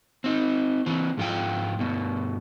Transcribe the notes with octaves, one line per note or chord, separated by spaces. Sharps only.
C4 D#4
E3 C4
G#2 F3 F4 G#4 G5
G2 B2